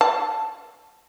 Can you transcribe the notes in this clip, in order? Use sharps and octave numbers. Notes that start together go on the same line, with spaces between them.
A5